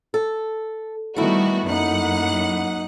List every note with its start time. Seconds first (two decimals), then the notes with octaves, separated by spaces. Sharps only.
0.14 A4
1.16 D#3 G3 A3 B3 E4 F#4
1.65 F#2 A#3 D#4 F#5